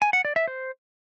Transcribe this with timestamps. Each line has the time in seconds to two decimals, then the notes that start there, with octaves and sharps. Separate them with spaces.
0.02 G#5
0.13 F#5
0.25 D5
0.36 E5
0.48 C5